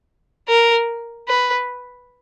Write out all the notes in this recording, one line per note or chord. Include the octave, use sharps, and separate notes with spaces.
A#4
B4